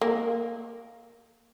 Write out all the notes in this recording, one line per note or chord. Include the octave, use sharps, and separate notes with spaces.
A#3